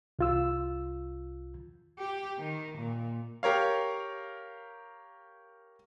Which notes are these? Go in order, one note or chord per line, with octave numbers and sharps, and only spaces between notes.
C2 F4 E6
G4
D#3
A#2
G4 A#4 C#5 F5